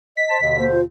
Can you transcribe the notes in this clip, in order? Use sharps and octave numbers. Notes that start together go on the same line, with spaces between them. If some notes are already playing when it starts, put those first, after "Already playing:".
D#5 B6
C5 A5
D#2 B2 D3 D#5
A#3 C5
F4